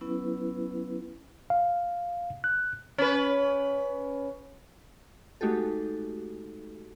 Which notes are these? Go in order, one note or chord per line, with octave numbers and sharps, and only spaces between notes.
F#3 B3 C#4 E4 B4
F5
F#6
C#4 B4
G#3 A3 D#4 F#4 G4 A4